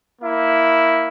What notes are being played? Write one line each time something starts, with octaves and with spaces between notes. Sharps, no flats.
A#3 E4